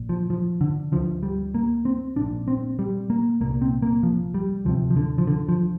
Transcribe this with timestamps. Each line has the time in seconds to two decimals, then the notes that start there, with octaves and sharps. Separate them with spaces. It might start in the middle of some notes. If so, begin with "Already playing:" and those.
Already playing: A#1 A#2
0.09 F3
0.30 F3
0.61 D3
0.92 D2 D3 F3
1.23 G3
1.54 A#3
1.85 C4
2.16 A#1 A#2 D4
2.48 C4
2.79 G3
3.10 A#3
3.41 C2 A#2 A#3
3.62 C4
3.82 A#3
4.03 F3
4.34 G3
4.65 D2 C3 F3
4.91 F3
4.97 D3
5.18 F3
5.27 D3
5.49 F3